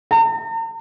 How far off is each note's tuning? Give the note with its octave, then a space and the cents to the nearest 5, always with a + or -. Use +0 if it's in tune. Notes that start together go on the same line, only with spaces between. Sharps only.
A#5 -45